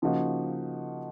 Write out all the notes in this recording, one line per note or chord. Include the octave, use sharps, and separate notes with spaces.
C#3 F3 A#3 D#4 F#4